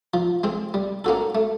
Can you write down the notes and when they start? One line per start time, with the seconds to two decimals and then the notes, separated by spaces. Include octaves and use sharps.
0.14 F3
0.44 G#3 C4
0.74 G3
1.04 A#3 C#4 F#4 A4
1.35 A3